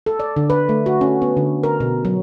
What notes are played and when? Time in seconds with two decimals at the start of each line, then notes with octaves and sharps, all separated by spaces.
0.06 A4
0.20 D5
0.36 D3
0.50 B4
0.69 A3
0.86 F#4
1.01 C#4
1.22 B3
1.37 D3
1.63 A#4
1.80 B2
2.05 F#3